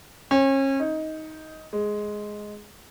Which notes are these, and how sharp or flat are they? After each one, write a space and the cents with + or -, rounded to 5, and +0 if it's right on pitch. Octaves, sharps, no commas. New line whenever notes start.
C#4 -35
D#4 +15
G#3 +5